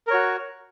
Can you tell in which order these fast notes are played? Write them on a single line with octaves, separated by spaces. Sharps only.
A#4 C#5 F#4